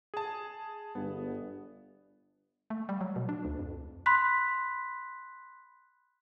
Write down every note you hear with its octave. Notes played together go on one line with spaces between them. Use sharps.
G#4 A5
G1 G2 B3
A3
G3
F#3
B2
D4
D2
F2
B5 C6 F#6 B6